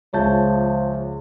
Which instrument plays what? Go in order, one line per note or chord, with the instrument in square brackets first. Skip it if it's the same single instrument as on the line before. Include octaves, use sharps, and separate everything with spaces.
[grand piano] C#2 A5 [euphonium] F3 [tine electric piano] C#5 E5 G6